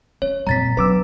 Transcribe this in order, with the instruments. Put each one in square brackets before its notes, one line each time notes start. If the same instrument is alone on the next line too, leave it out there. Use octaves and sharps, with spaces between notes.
[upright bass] C#4 [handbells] C#5
[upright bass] F2 [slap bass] A#2 G3 [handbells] A#5 A6 B6
[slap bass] E1 B1 D4 [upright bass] F#3 C#4 [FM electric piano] B4 D6 E6